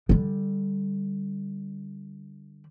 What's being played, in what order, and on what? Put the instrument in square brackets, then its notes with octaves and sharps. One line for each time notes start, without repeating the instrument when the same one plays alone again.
[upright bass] D3 G3